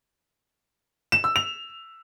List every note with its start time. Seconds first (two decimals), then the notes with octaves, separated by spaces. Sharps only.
1.12 E7
1.24 E6
1.36 F7